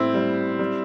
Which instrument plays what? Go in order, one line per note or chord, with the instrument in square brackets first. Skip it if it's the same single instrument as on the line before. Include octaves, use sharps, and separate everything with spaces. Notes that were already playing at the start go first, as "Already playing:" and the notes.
Already playing: [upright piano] A2 G3 C4 E4
G3
G3